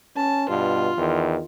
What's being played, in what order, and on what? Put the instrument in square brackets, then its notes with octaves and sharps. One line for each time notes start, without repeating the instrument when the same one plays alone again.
[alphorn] C#4 [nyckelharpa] A5
[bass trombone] G2 [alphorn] B2 [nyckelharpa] F4
[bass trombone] E2 [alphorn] D#3